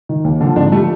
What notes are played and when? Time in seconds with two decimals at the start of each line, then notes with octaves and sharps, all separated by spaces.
0.09 D#3
0.25 D#2
0.41 D3 F3
0.56 G#2 C4 D4
0.72 F3 G3 A3